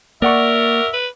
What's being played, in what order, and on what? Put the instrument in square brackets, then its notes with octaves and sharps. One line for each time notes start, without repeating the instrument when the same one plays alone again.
[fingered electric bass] A#3 [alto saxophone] A#4 [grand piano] D5 F#5 C#6 [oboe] E5
[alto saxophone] B4